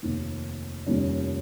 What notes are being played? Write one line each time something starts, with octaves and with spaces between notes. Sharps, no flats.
F1 D#2 D#3 A#3
F1 D#2 D#3 G3 C#4